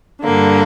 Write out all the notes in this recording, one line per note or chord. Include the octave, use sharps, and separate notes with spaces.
G2 D3 A#3